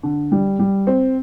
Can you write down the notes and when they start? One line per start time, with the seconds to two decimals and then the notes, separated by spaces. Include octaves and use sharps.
0.03 D3
0.32 G3
0.59 G3
0.87 C4